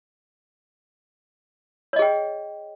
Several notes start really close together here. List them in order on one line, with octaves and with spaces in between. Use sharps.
C#5 D#5 G#4 G5